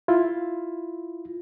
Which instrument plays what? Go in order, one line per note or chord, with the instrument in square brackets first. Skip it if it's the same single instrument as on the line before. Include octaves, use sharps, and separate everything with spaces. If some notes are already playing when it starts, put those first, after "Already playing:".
[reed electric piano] E4 F4